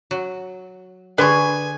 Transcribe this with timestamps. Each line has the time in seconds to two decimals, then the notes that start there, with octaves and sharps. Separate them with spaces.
0.11 F#3
1.18 D3 G#4 B4 G#5 C6 C#6